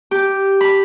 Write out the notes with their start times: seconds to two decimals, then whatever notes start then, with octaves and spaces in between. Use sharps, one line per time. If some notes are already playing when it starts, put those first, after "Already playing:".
0.11 G4
0.61 B5